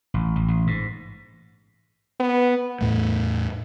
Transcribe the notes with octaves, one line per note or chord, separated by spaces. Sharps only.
A1
A1
A1
G#2
B3
E2 A2 A3